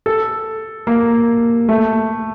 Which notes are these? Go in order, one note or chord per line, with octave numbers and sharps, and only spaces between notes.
A4
A#3
A3